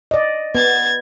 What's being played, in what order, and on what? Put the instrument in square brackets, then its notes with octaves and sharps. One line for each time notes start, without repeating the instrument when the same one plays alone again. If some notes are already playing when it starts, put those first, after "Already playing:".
[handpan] D5 D#5
[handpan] B3 [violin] G#6 A6